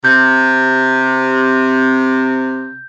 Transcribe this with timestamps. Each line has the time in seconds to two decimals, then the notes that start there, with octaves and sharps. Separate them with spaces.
0.05 C3 G6